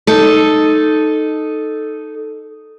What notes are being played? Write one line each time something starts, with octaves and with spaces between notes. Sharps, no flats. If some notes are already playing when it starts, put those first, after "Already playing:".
D#4 A4